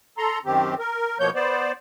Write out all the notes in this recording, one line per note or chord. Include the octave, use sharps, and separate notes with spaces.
A4 A#5 C6
F#2 D#3 C4 G4
A#4
B2 F3 A#3 C#5 G6
B3 C5 D5